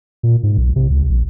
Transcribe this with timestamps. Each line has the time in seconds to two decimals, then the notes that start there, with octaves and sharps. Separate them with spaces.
0.23 A#2
0.43 G#2
0.58 B1
0.76 C3
0.90 C#2
1.09 A#1